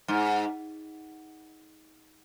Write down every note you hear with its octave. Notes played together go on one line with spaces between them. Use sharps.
G#2